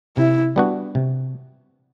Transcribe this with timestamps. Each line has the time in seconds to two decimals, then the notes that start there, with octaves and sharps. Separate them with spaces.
0.17 C3 E4
0.56 G3 B3 D4 F#4
0.95 C3